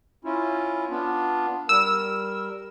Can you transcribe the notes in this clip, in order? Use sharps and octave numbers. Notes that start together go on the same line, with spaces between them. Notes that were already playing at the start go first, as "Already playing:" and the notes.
C#4 E4 F4
B3 D4 F4
G3 A#4 E6